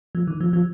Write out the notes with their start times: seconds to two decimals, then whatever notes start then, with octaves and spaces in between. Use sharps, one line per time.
0.15 F3
0.28 D#3
0.41 F3
0.53 F3